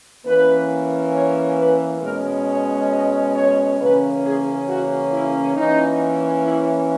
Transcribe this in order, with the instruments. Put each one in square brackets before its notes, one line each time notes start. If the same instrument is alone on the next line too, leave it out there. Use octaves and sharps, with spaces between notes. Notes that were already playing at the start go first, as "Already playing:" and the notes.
[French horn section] E3 A#3 C#4 B4
C#5
B4
B2 G#3 C#4 A#4
C#5
D#5
C#5
C#3 E3 A#3 C#4 B4
G#4
F#4
E4
E3 A#3 C#4 D#4
E4